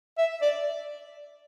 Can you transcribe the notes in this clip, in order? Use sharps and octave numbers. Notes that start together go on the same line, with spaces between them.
E5
D5